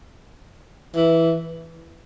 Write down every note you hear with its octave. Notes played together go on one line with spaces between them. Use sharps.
E3